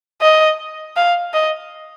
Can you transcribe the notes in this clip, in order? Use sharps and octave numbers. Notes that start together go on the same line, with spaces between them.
D#5
F5
D#5